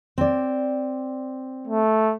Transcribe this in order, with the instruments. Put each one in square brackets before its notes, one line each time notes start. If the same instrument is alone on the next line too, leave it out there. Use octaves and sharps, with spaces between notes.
[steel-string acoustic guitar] C4 D5
[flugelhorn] A3